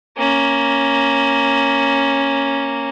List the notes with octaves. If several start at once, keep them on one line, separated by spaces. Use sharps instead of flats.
A#3 C#4